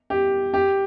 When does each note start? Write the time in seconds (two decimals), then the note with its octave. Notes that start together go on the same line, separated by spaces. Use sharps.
0.10 G4
0.54 G4